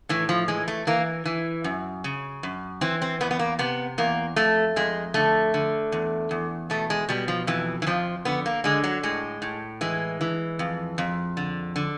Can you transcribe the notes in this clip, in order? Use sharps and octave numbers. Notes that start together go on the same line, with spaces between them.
A2 E3
F3
E3 G#3
A3
E3 A#3
E3
F#2
C#3
F#2
E3 C4
C4
E2 B3
B3
A#3
C3 B3
E2 A#3
F2 A3
F2 G#3
D3 A3
D3
E2
E2
B2 A3
G#3
B2 G3
F3
F2 E3
E3
F2 F3
D3 B3
A#3
D3 G#3
F#3
A2 G#3
A2
E3 G#3
E3
F2
F2
D3
D3